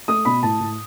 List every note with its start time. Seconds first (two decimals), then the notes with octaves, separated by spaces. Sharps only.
0.08 A3 D#6
0.25 B2 B5
0.43 A2 A5
0.60 A2